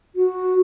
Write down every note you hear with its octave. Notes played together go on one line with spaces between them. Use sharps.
F#4